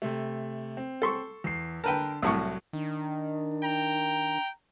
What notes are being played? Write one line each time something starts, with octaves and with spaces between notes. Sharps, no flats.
C3 A3
C4
A4 C6 C#6
E2 C7
D3 A#4 B4 G5 A5
C2 A2 F#3 C#6
D#3 D4
G5 A#5